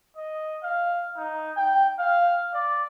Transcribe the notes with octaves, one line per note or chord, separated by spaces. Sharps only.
D#5
F5
D#4
G5
F5
D5